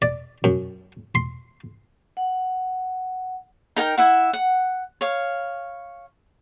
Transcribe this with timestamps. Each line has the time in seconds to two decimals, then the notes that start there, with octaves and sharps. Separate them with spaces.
0.02 D5
0.44 F#2
1.15 C6
2.17 F#5
3.76 D#4 A#4 F#5 G5
3.98 E4 E5 F#5
4.33 F#5
5.01 C#5 F5